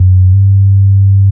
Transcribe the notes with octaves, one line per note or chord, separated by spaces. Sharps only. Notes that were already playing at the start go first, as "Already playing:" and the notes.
Already playing: F#2
G2